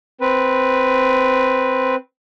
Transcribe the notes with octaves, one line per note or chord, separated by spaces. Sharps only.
C4 B4